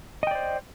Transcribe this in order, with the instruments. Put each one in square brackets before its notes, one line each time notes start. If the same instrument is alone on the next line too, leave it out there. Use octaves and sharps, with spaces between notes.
[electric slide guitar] D#5
G5
D5
C5